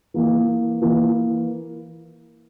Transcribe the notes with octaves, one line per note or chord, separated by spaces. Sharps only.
E3 A#3 E4 A#4
E3 A#3 E4 A#4